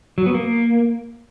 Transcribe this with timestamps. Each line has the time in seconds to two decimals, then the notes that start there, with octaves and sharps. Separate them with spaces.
0.18 F#3
0.26 B3
0.34 A#3